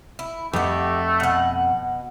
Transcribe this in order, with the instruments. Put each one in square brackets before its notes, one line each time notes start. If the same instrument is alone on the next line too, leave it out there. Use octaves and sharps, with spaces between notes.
[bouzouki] E4
[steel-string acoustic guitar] F2 [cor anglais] A3 [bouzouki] F#4 G4
[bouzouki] B2 F#5